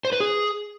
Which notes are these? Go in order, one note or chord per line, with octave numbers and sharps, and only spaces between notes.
C5
B4
G#4